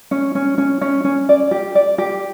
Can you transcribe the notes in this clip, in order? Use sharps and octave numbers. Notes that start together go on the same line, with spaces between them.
C#4
C#4
C#4
C#4
C#4
D5
G4
D5
G4